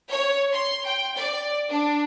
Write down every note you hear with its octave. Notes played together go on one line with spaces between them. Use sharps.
C#5
C6
G5
D5
D4